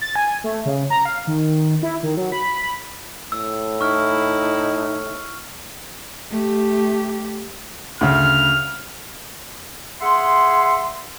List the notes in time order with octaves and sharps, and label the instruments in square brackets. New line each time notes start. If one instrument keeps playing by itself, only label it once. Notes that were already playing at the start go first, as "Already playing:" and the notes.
[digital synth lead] A6
G#5
A3
C#3
A#5
F5
D#3
E4
D#3
F#3
B5
B5
[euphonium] A2 [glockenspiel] E6
[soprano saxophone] D#4 [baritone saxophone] E4 [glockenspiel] C#6 F6
[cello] A3 G4
[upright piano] D2 C#3 [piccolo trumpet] F6
[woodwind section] G#4 E5 F#5 C6